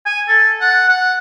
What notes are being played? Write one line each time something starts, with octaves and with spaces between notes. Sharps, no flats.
G#5
A4
F#5
F#5